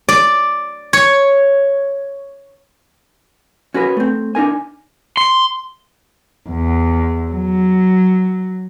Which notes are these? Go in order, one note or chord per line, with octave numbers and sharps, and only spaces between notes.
D5
C#5
C#4 F#4 G#4 A#4 B4
A3 C4
D4 D#4 A#4 G#5
C6
E2
F#3